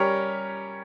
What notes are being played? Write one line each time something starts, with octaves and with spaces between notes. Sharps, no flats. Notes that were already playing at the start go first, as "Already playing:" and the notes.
Already playing: G3 C#4 G4 A#4 C#5